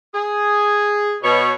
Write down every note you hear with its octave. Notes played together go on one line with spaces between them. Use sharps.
G#4
B2 C#5